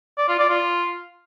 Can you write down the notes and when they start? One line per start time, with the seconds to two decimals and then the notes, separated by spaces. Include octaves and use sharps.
0.18 D5
0.29 F4
0.39 D5
0.50 F4